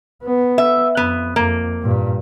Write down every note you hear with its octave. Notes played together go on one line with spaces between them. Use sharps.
B3
E5
F2 B3
F2 A#3
G2 A#2